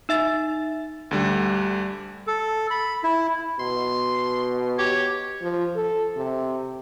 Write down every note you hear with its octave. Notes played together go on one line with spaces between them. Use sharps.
D#4 E5 A6
D2 D3 G3
A4
B5
E4
B2 C6
G4 C#5
F3
A4
C3